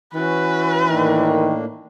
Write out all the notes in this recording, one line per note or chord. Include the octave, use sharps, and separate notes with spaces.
E3 C#4 F#4 B4
A2 D#3 A#3 D4